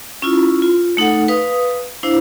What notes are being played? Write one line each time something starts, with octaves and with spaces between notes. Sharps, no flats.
C#4 E4 F4
F4
A3 D#4 A4 F#5
B4 F5 D#6
D4 E4 C5 F5